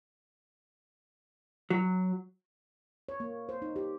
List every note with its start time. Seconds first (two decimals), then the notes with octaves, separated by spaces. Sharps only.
1.70 F#3
3.09 C#5
3.20 A#3
3.49 C5
3.62 D#4
3.76 G4